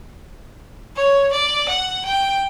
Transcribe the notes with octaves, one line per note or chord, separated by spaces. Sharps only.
C#5
D5
F#5
G5